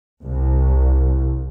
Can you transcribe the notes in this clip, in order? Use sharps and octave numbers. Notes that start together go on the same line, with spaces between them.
C2